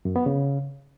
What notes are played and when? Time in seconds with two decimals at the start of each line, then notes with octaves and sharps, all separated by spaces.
0.05 F#2
0.16 B3
0.26 C#3